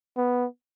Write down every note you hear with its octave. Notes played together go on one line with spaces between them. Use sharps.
B3